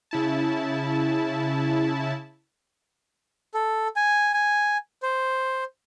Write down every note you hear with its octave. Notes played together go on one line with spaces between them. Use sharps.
C#3 E4 A5
A4
G#5
G#5
C5